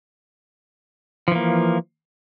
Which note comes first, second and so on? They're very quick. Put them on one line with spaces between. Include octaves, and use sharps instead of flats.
F3 E3 A#3